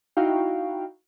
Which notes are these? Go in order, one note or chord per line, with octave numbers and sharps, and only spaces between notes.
D#4 E4 F#4 F5 G5